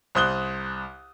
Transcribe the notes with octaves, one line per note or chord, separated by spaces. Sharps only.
C2 C5 D#6 F#6 G7